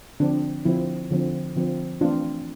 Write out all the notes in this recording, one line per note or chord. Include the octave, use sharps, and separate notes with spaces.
D3 F3 C4 D4
D3 F3 C4 E4
D3 F3 C4
D3 F3 C4
E3 A3 C4 D4 F4